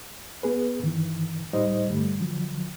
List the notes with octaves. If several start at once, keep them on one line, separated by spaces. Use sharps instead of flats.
B3 G#4 B4
G2 D#3 E3
C#2 A2 G3 D#4 C5 D#5
G2 D3 G3 A3
D3 F3 F#3